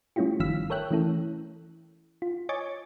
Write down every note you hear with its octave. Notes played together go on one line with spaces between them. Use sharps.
G3 A3 C#4 E4 F4 G4
G1 D#3 F3 F5 E6 B6
A4 A#4 C#5 E5 G5 F#6
E3 A3 C#4 E4 A4
F4
C#5 D#5 G#5 C#6 D6 A6